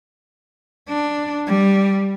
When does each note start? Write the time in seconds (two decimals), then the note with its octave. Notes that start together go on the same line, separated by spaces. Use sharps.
0.89 D4
1.47 G3